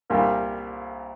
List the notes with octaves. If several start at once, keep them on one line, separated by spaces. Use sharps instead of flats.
C2 A#2 G3 A#3 F4